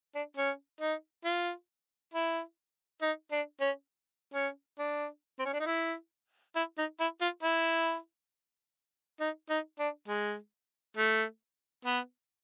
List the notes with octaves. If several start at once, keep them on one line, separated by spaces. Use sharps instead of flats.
D4
C#4
D#4
F4
E4
D#4
D4
C#4
C#4
D4
C4
C#4
D4
D#4
E4
E4
D#4
E4
F4
E4
D#4
D#4
D4
G#3
A3
B3